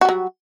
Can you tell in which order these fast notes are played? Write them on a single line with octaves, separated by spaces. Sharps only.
F#4 G3 F#3